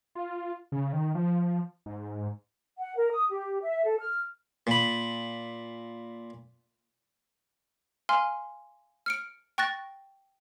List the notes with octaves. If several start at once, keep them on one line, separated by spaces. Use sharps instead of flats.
F4
C#3
D#3
F3
G#2
F#5
A#4
D#6
G4
E5
A4
F6
A#2 B5
F5 G#5 C6 F6
F6 C#7 D7
G5 C#6 F#6 A6 A#6